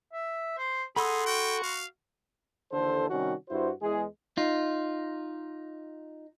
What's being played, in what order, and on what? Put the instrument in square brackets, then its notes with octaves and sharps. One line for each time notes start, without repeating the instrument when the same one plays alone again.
[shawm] E5
C5
[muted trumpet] D#4 [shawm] G#4 [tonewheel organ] A4 F#5 [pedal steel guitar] B5 C6 E6
[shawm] F#4 [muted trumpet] G5
[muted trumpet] F5
[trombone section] D#2 D3 E3 A4 C5
C3 D#3 G3 C#4 F#4
G2 E4 F#4 C5
E2 E3 G#3 G#4
[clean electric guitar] D#4 F4